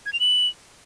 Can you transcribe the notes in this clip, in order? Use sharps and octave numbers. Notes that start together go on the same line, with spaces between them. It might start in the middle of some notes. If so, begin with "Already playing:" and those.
G#6
F7
F#7